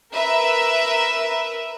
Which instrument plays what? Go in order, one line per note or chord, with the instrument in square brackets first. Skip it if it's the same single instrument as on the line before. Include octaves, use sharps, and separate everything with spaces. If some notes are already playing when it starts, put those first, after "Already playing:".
[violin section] A#4 B4 E5